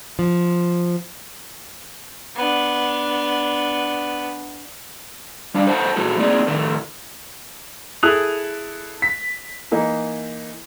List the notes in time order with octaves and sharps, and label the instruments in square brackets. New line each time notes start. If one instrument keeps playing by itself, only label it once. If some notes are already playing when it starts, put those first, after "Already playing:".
[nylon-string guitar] F3
[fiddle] B3 D4
[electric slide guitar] G3 D4 F5
A4 B4 C5 F#5 G#5 A5
A#2 E3 G#3 F#4 G#4 A4
A#3 C4 D#4 G#4 D5
A2 D#3 A3 A4
[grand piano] E4 G#4 A4 D#6 F#6 F7
B6
E3 A#3 D#4